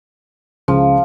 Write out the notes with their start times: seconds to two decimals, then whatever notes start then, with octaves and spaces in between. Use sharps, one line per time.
0.68 C#2 F3